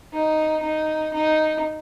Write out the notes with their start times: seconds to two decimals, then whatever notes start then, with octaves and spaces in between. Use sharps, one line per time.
0.14 D#4
0.63 D#4
1.13 D#4